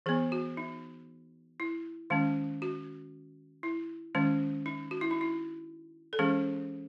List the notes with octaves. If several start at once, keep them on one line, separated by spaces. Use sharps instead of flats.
E3 B3 G#4
F#4
D#4
E4
D#3 G#3 C#4
F#4
E4
D#3 G#3 C#4
D#4
F#4
E4
D#4
E4
A4
E3 G#3 C#4 G#4